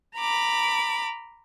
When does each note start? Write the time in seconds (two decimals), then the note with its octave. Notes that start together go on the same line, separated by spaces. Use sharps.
0.17 A#5 B5 D6